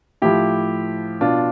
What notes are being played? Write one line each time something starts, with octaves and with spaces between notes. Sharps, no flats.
A2 F3 E4 G4
B2 D4 F4